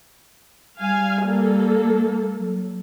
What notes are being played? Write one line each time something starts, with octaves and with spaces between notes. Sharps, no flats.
G3 F5 G#5
A#3 A4
F#3